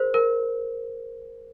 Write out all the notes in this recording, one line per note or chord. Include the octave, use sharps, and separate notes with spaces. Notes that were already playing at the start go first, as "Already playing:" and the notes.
Already playing: G#4 A#4 C5
A#4